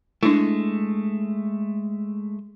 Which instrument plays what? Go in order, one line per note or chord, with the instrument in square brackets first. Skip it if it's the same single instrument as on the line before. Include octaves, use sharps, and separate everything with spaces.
[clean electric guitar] G#3 A3 [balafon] D4 E4